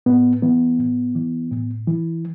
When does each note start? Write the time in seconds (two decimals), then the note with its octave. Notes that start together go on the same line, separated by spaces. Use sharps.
0.06 A2 B3
0.42 E3 B3
0.79 A2
1.15 E3
1.52 A2
1.87 E3